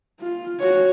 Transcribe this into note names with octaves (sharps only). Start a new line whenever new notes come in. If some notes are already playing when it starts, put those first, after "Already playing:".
F4
F#4 C#5